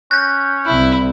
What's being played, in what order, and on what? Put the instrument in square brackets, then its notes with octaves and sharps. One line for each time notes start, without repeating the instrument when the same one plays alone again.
[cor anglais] C#4 [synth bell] F#6 G6
[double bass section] C2 C3 [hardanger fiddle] E4